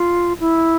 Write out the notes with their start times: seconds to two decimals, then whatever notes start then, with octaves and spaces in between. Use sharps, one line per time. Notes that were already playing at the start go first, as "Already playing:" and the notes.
Already playing: F4
0.40 E4